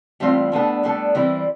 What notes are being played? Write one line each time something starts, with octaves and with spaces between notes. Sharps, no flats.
A2 E3 G3 C4 F4
A2 G3 B3 D4 A4
A2 G3 B3 D4 A4
E3 G3 C4 E4